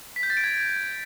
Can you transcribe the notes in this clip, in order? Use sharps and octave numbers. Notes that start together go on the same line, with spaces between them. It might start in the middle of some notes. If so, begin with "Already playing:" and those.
B6
G6
A6
D7
G#6